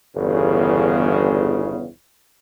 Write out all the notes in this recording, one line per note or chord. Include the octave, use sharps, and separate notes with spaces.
G1 E2 C#3